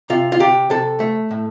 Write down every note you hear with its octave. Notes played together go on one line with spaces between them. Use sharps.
C3 F4
F4
C3 G4
C3 A4
A3
A2